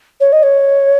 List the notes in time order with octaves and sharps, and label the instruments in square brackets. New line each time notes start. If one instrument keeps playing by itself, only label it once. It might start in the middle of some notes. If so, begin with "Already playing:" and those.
[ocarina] C#5
D#5
C#5